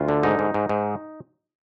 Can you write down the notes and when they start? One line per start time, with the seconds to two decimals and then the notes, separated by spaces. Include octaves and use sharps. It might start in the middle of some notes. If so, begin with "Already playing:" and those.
Already playing: D2 F4
0.08 D3
0.23 G#2 D#4
0.39 G#2
0.54 G#2
0.69 G#2